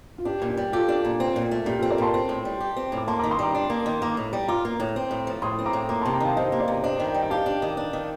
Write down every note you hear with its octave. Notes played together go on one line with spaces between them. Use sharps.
F4
D4 G4
A#2
G4
G3
F4 G4 A4
D4
A#2
C4
A#2
A3
A#2 G4
C4 F4 A4
A#4 D5
A#2 A5 C6
C4
A2
G3
G4
C4
A2
D6
A#3 A5 C6
D#3 A#5 D6
C6 D#6
G3 A#5 D6
D4
A#3
D#3
A#3 A#5 D6
A2
G3
F4 A#5 D6
A#3
A2
C4
A2
F3
A2 C6 D#6
C4
A#5 D6
A2
A#3 A#5 D6
C3 A5 C6
G5 A#5
D#3 F5 A5
C3 C5 D#5
A#3
D5 F5
C3
D4 C5 D#5
D#3
D#5 G5
G3
G5
G4 F5 A5
D4
D#3
D4
D#3